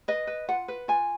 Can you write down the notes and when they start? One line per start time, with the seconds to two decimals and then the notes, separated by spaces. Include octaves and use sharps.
0.08 B4 D#5
0.27 B4
0.48 F4 F#5
0.68 B4
0.88 F4 G#5